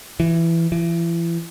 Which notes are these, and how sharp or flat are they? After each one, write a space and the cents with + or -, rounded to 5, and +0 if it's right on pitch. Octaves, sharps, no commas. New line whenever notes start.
E3 +15
E3 +35